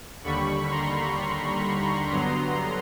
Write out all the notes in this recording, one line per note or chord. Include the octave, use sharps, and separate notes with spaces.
D#2 D3 G3 B5 C#6
A#5 C6
G2 D3 F#3 B3 A#5 C6